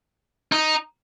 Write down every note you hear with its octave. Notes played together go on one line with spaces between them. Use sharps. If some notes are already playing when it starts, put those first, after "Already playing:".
D#4